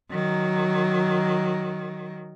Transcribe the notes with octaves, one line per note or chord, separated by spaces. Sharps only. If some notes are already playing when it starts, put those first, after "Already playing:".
D#3 F#3